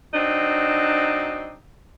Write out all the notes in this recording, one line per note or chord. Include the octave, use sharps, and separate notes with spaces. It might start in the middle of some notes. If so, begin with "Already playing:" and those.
F#3 C4 D4 D#4